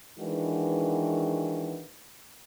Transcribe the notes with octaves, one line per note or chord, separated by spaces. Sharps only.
D#3 E3 G#3 D4 F#4 B4